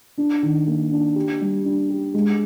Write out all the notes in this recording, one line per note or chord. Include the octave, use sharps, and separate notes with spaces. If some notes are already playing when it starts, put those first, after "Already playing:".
D4
D#3
A#3
D4
G4
G3
D4
G4
G#3